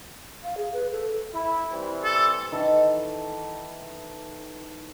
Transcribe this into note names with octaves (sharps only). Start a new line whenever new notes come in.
F5
G#4
B4
A4
E4
E3 G3 C4
A4
D#3 E3 A4